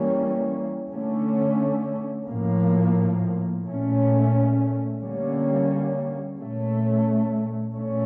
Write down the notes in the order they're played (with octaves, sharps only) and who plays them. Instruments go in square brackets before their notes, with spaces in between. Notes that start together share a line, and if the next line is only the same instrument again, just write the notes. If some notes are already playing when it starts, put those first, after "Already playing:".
Already playing: [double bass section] E3 G3 A#3 C#4
D3 A3 C#4
A2 F3 A#3
A#2 A3 C#4
D3 G3 A#3 C#4
A#2 A3 C#4
A#2 A3 C#4